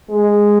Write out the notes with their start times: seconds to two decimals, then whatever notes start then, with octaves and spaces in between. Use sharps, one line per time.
0.10 G#3